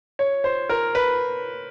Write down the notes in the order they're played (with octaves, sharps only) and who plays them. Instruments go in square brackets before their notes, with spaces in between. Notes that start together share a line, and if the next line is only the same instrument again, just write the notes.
[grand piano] C#5
C5
A#4
B4